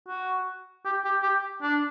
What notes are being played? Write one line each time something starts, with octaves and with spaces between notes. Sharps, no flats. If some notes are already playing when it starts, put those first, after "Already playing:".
F#4
G4
G4
G4
D4